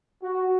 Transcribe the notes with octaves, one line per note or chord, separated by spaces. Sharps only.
F#4